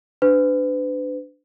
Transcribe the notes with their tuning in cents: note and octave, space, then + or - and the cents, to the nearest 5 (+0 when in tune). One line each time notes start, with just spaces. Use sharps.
D4 +0 B4 +40